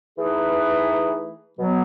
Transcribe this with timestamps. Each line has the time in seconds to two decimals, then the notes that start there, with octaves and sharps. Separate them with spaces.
0.18 E3 A3 D#4 G#4 B4
1.58 B2 F#3 B3